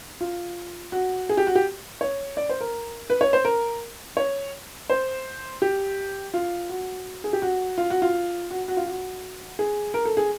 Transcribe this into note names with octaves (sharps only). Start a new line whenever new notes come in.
F4
F#4
G#4
G4
F#4
G4
C#5
D5
C5
A#4
B4
C#5
C5
A#4
C#5
C5
G4
F4
F#4
G#4
G4
F#4
F4
F#4
F4
F#4
F#4
F4
F#4
G#4
A#4
A4
G#4